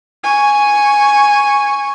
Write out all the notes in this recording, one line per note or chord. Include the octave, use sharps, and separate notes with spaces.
G#5 C#6